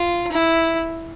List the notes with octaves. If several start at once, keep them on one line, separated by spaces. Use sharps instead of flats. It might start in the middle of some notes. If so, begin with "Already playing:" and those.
Already playing: F4
E4